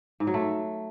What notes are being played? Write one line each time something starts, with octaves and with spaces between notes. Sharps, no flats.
G#2
F#3
A3